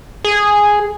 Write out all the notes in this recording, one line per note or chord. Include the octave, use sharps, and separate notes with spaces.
G#4